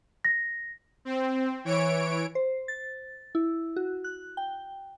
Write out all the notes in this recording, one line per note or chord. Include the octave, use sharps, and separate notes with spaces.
A#6
C4
E3 C#5 D7
C5
A6
E4
F#4
F#6
G5